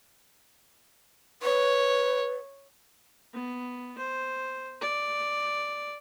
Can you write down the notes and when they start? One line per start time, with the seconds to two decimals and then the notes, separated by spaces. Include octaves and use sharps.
1.42 B4 C#5
3.34 B3
3.98 C5
4.81 D5